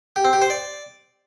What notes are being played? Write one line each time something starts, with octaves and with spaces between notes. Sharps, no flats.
G4
C4
G4
C5
D5